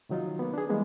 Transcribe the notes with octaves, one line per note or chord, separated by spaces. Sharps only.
C3 D#3 F#3 D#4 F4
A#3 B3
D4 G#4
E3 G3 G#3 A#3 B3